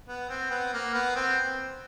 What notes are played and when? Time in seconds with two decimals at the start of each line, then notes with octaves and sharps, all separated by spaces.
0.08 B3
0.29 C4
0.50 B3
0.73 A#3
0.94 B3
1.16 C4